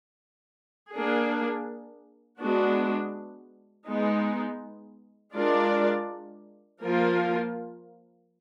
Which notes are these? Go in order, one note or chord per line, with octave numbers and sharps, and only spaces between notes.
A#3 D4 G#4
G#3 B3 D4 F#4
G#3 B3 D#4
G#3 D4 F4 A#4 D5
F3 A#3 F4 A#4